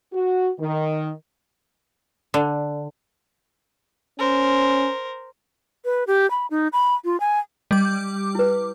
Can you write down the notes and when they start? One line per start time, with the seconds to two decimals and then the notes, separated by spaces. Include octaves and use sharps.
0.12 F#4
0.59 D#3
2.34 D3
4.19 C#4 A#4 C5
5.85 B4
6.07 G4
6.31 B5
6.50 D#4
6.73 B5
7.05 F4
7.20 G#5
7.71 G3 D#5 D6
8.35 E4 B4